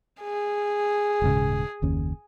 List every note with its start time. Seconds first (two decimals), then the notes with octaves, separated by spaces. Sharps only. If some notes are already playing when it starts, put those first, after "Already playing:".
0.21 G#4
1.22 D#1 G#2 C#3
1.82 F#1 D#2 C#4